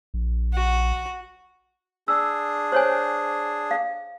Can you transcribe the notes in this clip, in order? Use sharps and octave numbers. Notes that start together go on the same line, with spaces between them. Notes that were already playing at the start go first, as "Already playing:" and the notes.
A#1
F#4
D4 G#4 E6
C5 C#5 G#5
F5